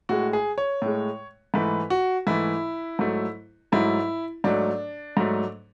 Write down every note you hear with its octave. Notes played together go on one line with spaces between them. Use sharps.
A2 G#3 F#4
G#4
C#5
A2 G#3
G#2 E3 A3 B4
F#4
G#2 E3 A3 E4
G#2 F#3 A3
G#2 F#3 A3 E4
G#2 F#3 A3 D4
G#2 F#3 A3